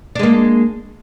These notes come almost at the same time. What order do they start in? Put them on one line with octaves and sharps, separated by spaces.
D4 G#3 A#3